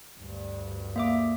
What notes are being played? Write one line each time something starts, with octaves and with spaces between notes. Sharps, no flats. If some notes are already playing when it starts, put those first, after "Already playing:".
D2 G2
A#3 E5 D6